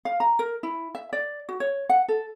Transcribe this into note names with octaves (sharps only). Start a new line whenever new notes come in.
F5
A#5
A#4
E4
E5
D5
F#4
C#5
F#5
A4